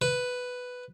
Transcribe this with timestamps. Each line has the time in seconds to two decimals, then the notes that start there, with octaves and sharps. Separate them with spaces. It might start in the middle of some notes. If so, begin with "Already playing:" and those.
0.02 B4